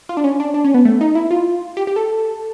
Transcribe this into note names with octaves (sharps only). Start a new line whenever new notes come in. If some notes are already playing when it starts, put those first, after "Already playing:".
F4
D4
C#4
D4
D4
C#4
B3
A3
D#4
E4
F4
G4
G4
A4